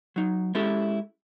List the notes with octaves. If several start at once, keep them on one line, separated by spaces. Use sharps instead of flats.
F#3 D#4
G#3 C#4 E4 G4 A4